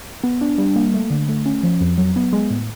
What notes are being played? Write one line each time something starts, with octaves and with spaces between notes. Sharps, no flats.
B3
D4
G3
A#3
A3
D3
A3
C#4
F3
F2
F#3
B3
G#3
A2